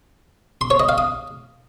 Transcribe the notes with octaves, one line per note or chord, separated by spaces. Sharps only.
C6
C#5
D#5
F5
D#6